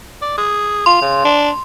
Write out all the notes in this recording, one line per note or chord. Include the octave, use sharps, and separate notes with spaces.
D5
G#4
F4 C6
C#3
D4